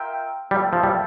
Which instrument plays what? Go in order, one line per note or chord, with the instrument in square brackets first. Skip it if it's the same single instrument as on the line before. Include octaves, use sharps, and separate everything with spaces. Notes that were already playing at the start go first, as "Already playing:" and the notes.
Already playing: [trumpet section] F4 A#4 E5 G5
[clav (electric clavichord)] G3 [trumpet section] A#3 F4 A4 E5 G5
[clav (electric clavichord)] F3
G3